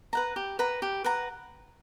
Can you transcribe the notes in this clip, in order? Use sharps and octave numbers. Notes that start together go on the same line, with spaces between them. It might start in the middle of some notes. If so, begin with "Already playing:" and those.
B4 F#5 A#5
G4
B4 F#5 A#5
G4
B4 F#5 A#5